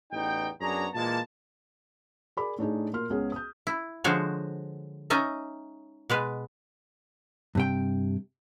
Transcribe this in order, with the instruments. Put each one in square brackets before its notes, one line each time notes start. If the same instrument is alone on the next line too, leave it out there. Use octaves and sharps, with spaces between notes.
[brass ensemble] A1 E2 B3 D#4 G5
F#2 B3 D4 G#4 C#5 A#5
A#2 E3 G#3 A#3 A5
[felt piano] G#4 A#4 D5 B5 D6
A2 D4 D#4 G#4
A#2 A#4 C6 F6
C#2 B3 C#4 G#4 G#5
D#6 G6
[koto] E4
D3 F3 G#3 F#4 C5 C#5
C#4 D#4 D#5 E5
B2 G#3 B4
[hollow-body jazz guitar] G2 C3 G5